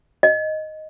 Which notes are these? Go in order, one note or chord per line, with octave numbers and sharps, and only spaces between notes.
D#5